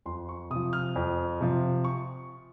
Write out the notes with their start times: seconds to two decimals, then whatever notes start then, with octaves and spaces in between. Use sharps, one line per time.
0.06 F2 C6
0.29 C#6
0.50 C3 D#6
0.56 F3
0.73 F6
0.96 F2
1.41 C3 F3
1.85 C#6